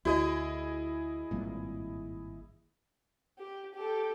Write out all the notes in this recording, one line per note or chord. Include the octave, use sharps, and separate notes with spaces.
D2 E4 F#4 G#4 D5 D#5
G#1 G2 A#2
G4
G4 A4